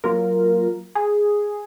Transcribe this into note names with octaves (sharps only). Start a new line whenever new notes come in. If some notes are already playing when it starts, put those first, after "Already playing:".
F#3 A#3 F4 A#4
G#4